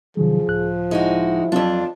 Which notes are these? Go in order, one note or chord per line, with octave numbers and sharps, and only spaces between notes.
C3 D#3 F3 F#3 G#4
C#2 A2 F#6
G#3 D#4 E4 F#4
F2 F#3 C4 D4 F4